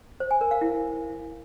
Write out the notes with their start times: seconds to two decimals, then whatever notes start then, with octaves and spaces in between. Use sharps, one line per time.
0.20 C5
0.31 G#5
0.41 A#4
0.51 F5
0.61 E4